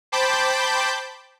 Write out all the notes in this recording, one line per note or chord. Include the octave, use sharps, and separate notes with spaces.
C5 G5 A5 B5 D6 G6